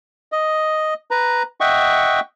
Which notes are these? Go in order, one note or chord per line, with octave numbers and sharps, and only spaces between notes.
D#5
B4 A#5
D#5 E5 F#5 G5 C#6